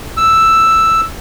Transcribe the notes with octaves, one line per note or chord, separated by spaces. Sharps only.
E6